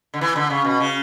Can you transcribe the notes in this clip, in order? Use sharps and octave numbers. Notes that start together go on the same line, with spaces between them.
D3
E3
D3
C#3
B2
C#3